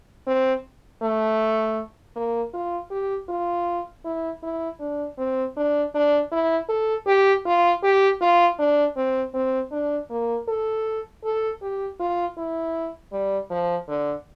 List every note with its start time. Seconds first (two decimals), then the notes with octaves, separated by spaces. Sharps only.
0.27 C4
1.02 A3
2.16 A#3
2.54 F4
2.91 G4
3.29 F4
4.04 E4
4.43 E4
4.80 D4
5.18 C4
5.57 D4
5.94 D4
6.32 E4
6.69 A4
7.07 G4
7.46 F4
7.83 G4
8.22 F4
8.59 D4
8.96 C4
9.34 C4
9.72 D4
10.10 A#3
10.48 A4
11.24 A4
11.62 G4
12.00 F4
12.37 E4
13.12 G3
13.50 F3
13.88 D3